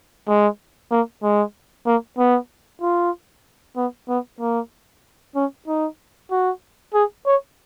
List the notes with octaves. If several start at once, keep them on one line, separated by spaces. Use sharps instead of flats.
G#3
A#3
G#3
A#3
B3
F4
B3
B3
A#3
C#4
D#4
F#4
G#4
C#5